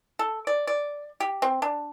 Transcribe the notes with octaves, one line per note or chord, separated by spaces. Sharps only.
A4
D5
D5
G4
C4
D4